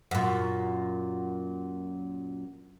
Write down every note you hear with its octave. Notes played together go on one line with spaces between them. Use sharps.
F#2 A#2